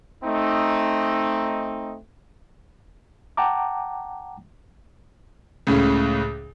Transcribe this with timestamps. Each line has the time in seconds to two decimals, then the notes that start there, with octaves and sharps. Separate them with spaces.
0.24 A3 C4 D#4
3.37 F#5 G5 A5 A#5 D6
5.67 C#2 A2 C#3